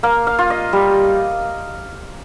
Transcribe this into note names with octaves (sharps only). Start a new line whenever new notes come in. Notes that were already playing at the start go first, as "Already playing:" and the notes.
A#3 F5
F5
F4
D#5
G3